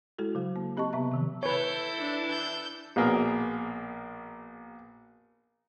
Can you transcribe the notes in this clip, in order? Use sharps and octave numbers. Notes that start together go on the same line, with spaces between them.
G#3 E4 F#4 A4
C#3 F#3
A#3
C4 G4 D#5 A5 C#6
C3 B3 E5 A#5
C3 D#3 F3
E4 A4 B4 C#5 G6
E3 D4
E6 G6
A#1 B2 A#3 G#4 A#4